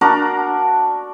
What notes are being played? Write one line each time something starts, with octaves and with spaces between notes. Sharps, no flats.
D4 F#4 A#4